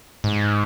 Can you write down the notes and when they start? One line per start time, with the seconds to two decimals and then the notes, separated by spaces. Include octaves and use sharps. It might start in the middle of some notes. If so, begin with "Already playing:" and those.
0.24 G#2